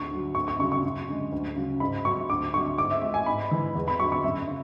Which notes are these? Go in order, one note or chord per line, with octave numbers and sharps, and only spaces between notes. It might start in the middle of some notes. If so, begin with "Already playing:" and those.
Already playing: D2 C#6
D3 F#3
D2 C#6
C#6
C#3 F#3 C#6
C#6
F#2
D3 G#3
D2
C#3 F#3
G#2 B5
F#3 C#6
D2 D6
D3 F#3 C#6
G#2 D6
E5
G#3 E5
G#5
G#2 B5
E3 G#3
E2
B5
D3 F#3 C#6
C#6
F#2 E5
C#3